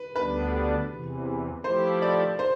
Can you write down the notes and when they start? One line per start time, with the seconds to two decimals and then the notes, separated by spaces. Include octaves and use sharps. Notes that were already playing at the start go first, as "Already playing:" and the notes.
Already playing: B4
0.15 D2 D3 G3 B3 D4 B4
0.90 E2 C3 E3
1.64 F3 A3 E4 G4 C5
2.02 D5
2.39 C5